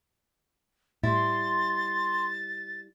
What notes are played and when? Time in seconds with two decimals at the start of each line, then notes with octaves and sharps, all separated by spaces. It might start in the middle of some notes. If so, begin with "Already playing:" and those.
1.04 A2 G3 E4 C6 A6